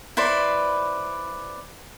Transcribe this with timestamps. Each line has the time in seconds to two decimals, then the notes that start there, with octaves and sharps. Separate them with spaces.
0.17 E4 B4 C5 D5